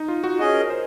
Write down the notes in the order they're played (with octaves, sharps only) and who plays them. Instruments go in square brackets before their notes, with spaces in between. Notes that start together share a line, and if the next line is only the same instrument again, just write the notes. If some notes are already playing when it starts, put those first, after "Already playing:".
Already playing: [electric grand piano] D#4
F4
F#4
[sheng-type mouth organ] C#4 G#4 D#5 [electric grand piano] F#4
[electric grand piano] A#4
C5